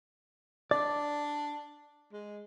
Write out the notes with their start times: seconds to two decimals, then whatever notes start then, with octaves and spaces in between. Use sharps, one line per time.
0.71 D4 D5
2.13 G#3